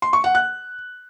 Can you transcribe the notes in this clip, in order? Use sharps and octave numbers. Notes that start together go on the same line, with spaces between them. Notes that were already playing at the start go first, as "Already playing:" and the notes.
C6
C#6
F#5
F#6